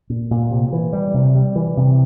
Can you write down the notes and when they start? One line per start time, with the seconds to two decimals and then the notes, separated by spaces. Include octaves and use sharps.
0.10 A#2
0.31 A#2
0.51 C3
0.73 E3
0.93 G3
1.14 C3
1.35 G3
1.56 E3
1.77 C3